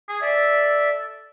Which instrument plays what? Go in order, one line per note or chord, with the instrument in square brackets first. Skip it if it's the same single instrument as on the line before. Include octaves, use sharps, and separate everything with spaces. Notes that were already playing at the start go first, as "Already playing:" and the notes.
[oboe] G#4
[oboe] A4 [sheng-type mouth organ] D5 E5